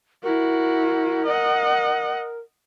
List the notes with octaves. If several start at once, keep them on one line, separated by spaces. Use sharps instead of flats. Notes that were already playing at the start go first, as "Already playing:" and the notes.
E4 F#4 A#4
D#5 F#5